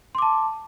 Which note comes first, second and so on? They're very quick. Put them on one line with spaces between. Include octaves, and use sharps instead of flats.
C6 D6 A5